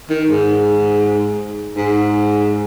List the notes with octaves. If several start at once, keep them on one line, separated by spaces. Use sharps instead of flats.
D#3
G#2
G#2